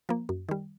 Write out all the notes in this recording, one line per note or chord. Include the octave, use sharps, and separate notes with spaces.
F3 A#3
F#2
D#3 G3